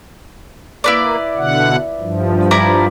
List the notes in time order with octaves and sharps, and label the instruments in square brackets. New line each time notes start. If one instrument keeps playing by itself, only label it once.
[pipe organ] A#3 [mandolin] E4 B4 D5
[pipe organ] B2 D3 F#5
G2 F3
[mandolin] E4 D5 A#5